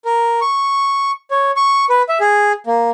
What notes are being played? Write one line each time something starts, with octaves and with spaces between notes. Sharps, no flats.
A#4
C#6
C#5
C#6
B4
E5
G#4
A#3